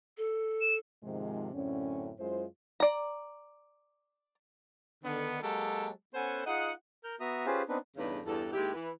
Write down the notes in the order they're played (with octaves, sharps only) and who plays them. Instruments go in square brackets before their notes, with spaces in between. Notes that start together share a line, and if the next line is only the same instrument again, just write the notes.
[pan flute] A4
[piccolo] E7
[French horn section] G#2 C3 D#3 F3 G#3
F#2 A2 D3 C4 C#4
F#2 G#3 E4 F4 C5
[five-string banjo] D5 A#5
[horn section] D3 D#3 B3
F#3 G#3 A#3 G4 A4
B3 C#4 A4 C5 F#5 G#5
D#4 F4 G#4 D#5 F#5
[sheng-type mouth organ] A#4 F6 G6
B3 F#4 E5 A#5 D#6
C#4 F4 G4 G#4 B4 C5
B3 C4 D4 D#4 B4
[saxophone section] E2 G2 C#3 A3 D#4 B4
E2 G2 A4
D#2 G#3 E4 G4
E3 B4